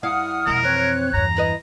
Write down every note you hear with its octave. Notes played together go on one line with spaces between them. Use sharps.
G2 E4 F5 F#5 D#6 F6
F2 B2 G#3 E4 A#4
E3 C4 C#5 F#6
E2 G2 A#5
E4 B4 D#5